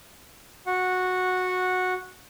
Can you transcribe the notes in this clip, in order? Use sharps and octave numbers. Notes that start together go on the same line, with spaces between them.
F#4 F#5